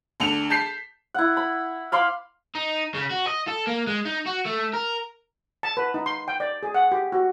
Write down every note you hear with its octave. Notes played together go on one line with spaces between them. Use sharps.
D2 D4 C#7 F7
A5 G6 B6 C7
E4 F#5
B5
F5 B5 C6 D6
D#4
C#3
F#4
D#5
A4
A#3
G#3
D#4
F#4
A3
A#4
A5
B4
D#4
C6
G5
D5
G#4
F#5
G4
F#4